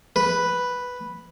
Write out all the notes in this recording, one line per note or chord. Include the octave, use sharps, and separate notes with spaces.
B4